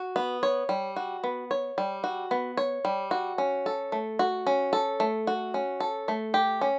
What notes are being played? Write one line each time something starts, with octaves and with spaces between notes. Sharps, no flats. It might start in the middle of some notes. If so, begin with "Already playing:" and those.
Already playing: F#4
B3
C#5
G3
F#4
B3
C#5
G3
F#4
B3
C#5
G3
F#4
C#4
A4
A3
F#4
C#4
A4
A3
F#4
C#4
A4
A3
G4
C#4